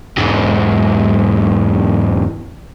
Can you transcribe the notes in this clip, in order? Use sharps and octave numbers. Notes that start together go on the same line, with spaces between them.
E2 G#2